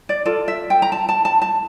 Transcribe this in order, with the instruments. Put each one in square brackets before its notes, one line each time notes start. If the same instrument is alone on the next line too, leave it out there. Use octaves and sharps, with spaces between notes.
[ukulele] D5
F4 A4 D5
E5
G5
A#5
A5
A5
A5
A5